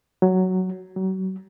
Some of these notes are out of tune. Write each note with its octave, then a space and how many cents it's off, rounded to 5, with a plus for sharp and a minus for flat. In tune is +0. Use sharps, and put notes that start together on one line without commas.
F#3 +5
F#3 +35